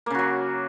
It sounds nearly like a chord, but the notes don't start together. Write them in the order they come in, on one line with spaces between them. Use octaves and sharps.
A#3 C#3 F#4 F#3